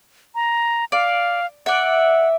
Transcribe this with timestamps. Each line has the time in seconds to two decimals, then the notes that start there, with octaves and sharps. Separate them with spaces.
0.35 A#5
0.92 D5 F5
1.66 D5 E5 F#5